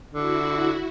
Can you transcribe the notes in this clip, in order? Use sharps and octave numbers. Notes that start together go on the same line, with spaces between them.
D3 E4 F#4